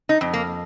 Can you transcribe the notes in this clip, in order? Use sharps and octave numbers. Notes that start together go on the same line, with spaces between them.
D#4
F2
A#3